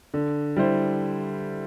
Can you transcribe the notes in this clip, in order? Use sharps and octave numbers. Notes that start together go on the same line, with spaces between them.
D3
G3 E4 C5